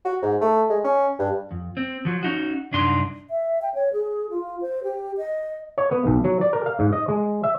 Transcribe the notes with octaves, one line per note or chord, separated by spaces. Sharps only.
F#4
G#2
A3
G#3
C#4
G2
F2
C4
F3 F#3
C#4 D#4 F#4
C2 F#2 D4 D#4 C6
E5
G5
C#5
G#4
F4
C5
G4
D#5
C#5
B3
B1
F#3
D5
A#4
F5
G#2
D#5
G#3
E5